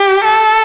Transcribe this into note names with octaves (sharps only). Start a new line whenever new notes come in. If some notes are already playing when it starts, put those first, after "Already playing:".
Already playing: G4
A4